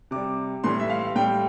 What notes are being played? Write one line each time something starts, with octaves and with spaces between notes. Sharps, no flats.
C3 G3 D6
A2 E3 G3 C6
E5
F5
A2 G3 G5